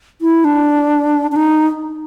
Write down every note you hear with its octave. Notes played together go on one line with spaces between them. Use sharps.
E4
D4
D4
D#4